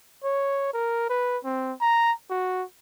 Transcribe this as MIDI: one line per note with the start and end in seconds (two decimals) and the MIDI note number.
0.24 0.70 73
0.74 1.08 70
1.10 1.38 71
1.45 1.73 60
1.81 2.12 82
2.31 2.63 66